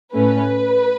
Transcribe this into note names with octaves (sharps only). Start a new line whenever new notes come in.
A2 A3 C#4 B4